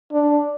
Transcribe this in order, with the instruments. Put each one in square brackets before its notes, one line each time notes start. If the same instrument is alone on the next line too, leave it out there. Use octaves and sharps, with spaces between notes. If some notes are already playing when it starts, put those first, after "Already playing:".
[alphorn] D4